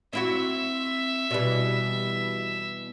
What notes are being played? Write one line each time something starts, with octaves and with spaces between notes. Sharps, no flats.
C4 E4 F#4 E5
B2 E3 G3